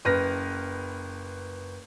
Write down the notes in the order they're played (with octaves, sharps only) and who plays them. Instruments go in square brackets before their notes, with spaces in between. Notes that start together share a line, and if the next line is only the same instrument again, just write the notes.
[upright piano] F#1 B4 F6 A#6